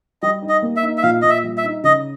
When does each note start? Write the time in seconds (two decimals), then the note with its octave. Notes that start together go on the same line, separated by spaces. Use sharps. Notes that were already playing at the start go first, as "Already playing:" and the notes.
0.22 G3 D#5
0.42 D#4
0.49 D#5
0.62 A#3
0.76 E5
0.83 D#4
0.98 E5
1.03 A#2 F5
1.22 A#2 D#5
1.30 E5
1.44 G3
1.57 E5
1.64 D#4
1.83 C#3 D#5